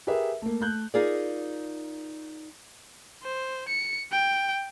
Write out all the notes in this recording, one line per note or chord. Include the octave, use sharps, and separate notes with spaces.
G4 G#4 A#4 B4 E5
A3 A#3
A3 F#6 G6
D#4 F4 G#4 A#4 D5
C5
C#7
G5